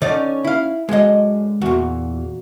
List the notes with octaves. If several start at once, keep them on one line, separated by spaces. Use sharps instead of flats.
D3 C#4 D#4 D5
E4 F5
F#2 D3 G#3 D#5
E2 A#2 F#4